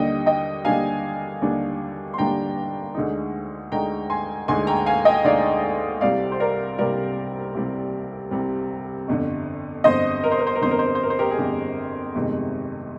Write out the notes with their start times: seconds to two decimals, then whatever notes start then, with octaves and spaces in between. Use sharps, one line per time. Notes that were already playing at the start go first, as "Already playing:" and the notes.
Already playing: D#2 D3 G3 D4 D#5 G5
0.26 D#5 G5
0.65 D#2 D3 G3 D4 F5 G#5
1.41 D#2 D3 G3 D4
2.14 C6
2.18 D#2 D3 G3 D4 G5 A#5
2.95 D2 D3 G#3 D#4
3.72 D2 D3 G#3 D#4 G5 A#5
4.10 G#5 C6
4.48 D2 D3 G#3 D#4 G#5 C6
4.67 G5 A#5
4.86 F5 G#5
5.05 D#5 G5
5.24 D2 D3 G#3 D#4 D5 F5
6.01 C2 C3 G3 D5 F5
6.32 C5
6.40 A#4 D5
6.78 C2 C3 G3 A#4 D5
7.55 C2 C3 G3
8.31 C2 C3 G3
9.08 G1 F2 D3
9.84 G1 F2 D3 C5 D#5
10.24 A#4
10.31 C5
10.39 A#4
10.47 C5
10.55 A#4
10.62 G1 F2 D3 C5
10.71 A#4
10.79 C5
10.86 A#4
10.95 C5
11.03 A#4
11.10 C5
11.19 G4 A#4
11.31 G#4
11.38 G1 F2 D3 G4
12.15 G1 F2 C3 D#3 G#3